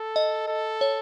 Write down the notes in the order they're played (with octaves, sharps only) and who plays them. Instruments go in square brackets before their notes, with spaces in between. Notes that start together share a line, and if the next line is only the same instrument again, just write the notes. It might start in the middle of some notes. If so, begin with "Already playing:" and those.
Already playing: [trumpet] A4
[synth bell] D#5
[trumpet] A4
[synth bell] C#5